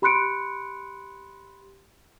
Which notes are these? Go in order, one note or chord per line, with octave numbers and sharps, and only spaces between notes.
G4 B5 C6 F#6 C#7 D7